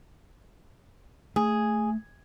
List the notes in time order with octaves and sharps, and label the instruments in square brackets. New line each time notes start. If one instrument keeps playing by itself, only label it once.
[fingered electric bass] A3 [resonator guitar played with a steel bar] G#4